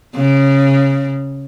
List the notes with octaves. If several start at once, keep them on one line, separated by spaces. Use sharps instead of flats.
C#3